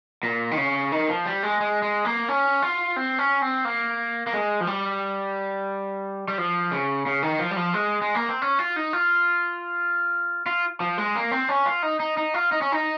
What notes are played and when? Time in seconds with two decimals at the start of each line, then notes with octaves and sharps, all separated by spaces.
0.23 A#2
0.51 D#3
0.57 C#3
0.92 D#3
1.09 F3
1.26 G3
1.43 G#3
1.60 G#3
1.82 G#3
2.05 A#3
2.29 C#4
2.62 F4
2.96 C4
3.19 C#4
3.42 C4
3.65 A#3
4.27 A#3
4.33 G#3
4.60 F3
4.67 G3
6.28 G3
6.38 F3
6.71 C#3
7.06 C#3
7.23 D#3
7.39 F3
7.51 G3
7.57 F3
7.74 G#3
8.02 G#3
8.15 A#3
8.29 C4
8.42 C#4
8.59 F4
8.76 D#4
8.93 F4
10.46 F4
10.80 F3
10.98 G#3
11.15 A#3
11.31 C4
11.49 C#4
11.66 F4
11.83 D#4
12.00 D#4
12.17 D#4
12.34 F4
12.52 D#4
12.62 C#4
12.72 D#4